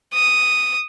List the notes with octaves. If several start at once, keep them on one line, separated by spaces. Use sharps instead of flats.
D#6